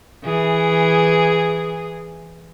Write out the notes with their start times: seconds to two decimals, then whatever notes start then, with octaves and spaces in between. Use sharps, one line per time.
0.24 E3 G#4